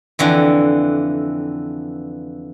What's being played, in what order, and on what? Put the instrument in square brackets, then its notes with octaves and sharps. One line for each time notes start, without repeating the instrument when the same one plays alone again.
[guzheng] F2 D3 E3